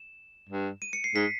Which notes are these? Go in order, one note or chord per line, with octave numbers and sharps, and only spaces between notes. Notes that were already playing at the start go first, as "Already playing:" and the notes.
Already playing: E7
G2
D#7
C#7
C7
G#2 B6